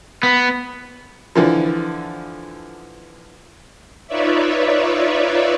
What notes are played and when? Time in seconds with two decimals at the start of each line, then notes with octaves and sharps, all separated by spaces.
0.23 B3
1.35 D3 E3 F3
4.07 D#4 F4 B4 C#5 D5 E5